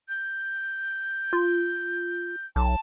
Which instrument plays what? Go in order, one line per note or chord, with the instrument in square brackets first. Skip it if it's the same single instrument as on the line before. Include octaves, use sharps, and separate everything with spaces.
[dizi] G6
[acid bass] F4
[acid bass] B1 [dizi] A5